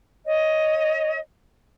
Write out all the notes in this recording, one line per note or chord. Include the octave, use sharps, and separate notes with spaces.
C#5 D#5